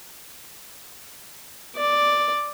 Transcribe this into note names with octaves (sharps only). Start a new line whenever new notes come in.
D5